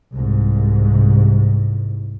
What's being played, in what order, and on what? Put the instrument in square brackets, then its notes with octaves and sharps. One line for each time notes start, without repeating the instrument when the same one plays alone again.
[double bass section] C2 G#2 C3